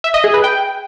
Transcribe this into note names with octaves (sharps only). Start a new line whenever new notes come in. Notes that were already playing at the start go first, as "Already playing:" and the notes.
E5
D#5
G#4
B4
G5